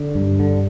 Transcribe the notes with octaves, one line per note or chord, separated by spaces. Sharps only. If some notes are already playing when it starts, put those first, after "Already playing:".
Already playing: D3
G2
D3